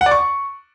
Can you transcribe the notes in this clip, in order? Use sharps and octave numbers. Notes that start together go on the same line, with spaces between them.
F#5
D5
C#6